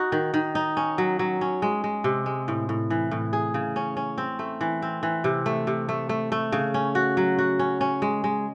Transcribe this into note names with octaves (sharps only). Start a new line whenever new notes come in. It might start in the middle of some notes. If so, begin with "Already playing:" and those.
Already playing: D#4 F#4
D#3
D#3
D#4
C#4
F#3
F#3
C#4
G#3
G#3
C3
G#3
A2
A2
E3
A2
G#4
C#3
C#4
C#4
C4
A3
E3
C4
E3
C3
A3
C3
A3
A3
A3
C#3
C#4
F#4
F#3
F#4
C#4
C#4
G#3
G#3